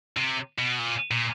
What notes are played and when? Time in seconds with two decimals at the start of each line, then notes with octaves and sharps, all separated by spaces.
0.17 C3
0.59 B2
0.79 A#2
1.11 A#2